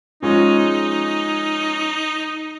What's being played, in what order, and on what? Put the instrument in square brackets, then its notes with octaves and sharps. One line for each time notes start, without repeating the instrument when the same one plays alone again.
[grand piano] F3 G#3 C#4 [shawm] D#4